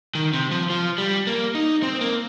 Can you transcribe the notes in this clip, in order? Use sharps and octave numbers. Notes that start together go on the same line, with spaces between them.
D#3
C3
F3
F3
G3
A#3
D#4
C4
A#3